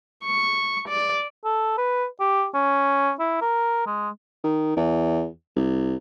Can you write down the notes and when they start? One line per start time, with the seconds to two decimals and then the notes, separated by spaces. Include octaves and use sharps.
0.24 C#6
0.89 D5
1.44 A4
1.78 B4
2.20 G4
2.54 C#4
3.19 E4
3.41 A#4
3.86 G#3
4.44 D#3
4.77 E2
5.56 C2